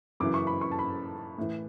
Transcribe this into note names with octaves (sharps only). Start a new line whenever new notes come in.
F#2 C#3 E3 D6
C#6
B5
C#6
A5
B5
A2 E3